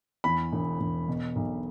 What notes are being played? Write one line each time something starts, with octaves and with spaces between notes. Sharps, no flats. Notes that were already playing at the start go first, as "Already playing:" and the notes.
E2 B5
E1
E1
B2
B1